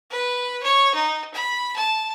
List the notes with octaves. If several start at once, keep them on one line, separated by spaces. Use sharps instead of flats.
B4
C#5
D#4
B5
A5